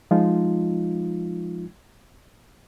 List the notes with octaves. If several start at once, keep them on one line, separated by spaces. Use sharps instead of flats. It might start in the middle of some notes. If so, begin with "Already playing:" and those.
F3 G#3 D#4 F4